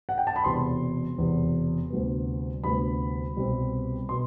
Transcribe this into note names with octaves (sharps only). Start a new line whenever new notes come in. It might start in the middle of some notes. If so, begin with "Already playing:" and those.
F#5
G5
A5
B5
E1 E2 C3 C6
E1 E2 C3
D2 C3 G3 B3
D2 C3 G3 B3 B5
C2 B2 G3 C4
B2 C6